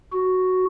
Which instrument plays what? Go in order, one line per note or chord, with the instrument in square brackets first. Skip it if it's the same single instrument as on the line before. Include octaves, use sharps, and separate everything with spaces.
[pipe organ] F#4